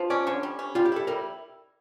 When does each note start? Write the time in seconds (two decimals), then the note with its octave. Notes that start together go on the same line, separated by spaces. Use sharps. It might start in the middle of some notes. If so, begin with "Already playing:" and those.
Already playing: F3
0.10 C#4 D5
0.27 D3 C#5
0.43 G3
0.59 C#4
0.75 G3 F4
0.85 G4
0.92 E4 A4
1.07 G3 A#4